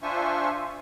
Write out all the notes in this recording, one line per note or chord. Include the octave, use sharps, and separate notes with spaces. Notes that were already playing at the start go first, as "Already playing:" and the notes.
D4 F4 C5 E5 G#5 C#6